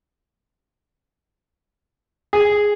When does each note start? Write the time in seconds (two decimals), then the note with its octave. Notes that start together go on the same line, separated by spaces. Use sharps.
2.33 G#4